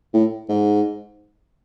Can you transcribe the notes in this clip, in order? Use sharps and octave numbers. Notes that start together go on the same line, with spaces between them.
A2
G#2